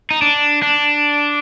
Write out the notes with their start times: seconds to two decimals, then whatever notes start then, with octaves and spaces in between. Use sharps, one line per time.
0.11 D#4
0.22 D4
0.62 D4